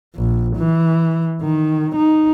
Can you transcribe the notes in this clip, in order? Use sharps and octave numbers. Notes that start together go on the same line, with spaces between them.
A#1
E3
D#3
D#4